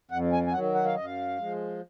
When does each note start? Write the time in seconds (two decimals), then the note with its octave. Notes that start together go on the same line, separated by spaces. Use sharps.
0.11 F2 F#5
0.33 G#5
0.47 G#5
0.53 D#3 F#3 F#5
0.75 F#5
0.85 F5
0.95 F#2 D#5
1.05 F5
1.38 F3 G#3